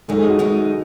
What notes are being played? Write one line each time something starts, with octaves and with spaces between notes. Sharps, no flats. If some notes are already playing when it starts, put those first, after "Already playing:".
F#2 D#3 G#3 D#4 A4
G#4
F#4
F#2 D#3 G#3 D#4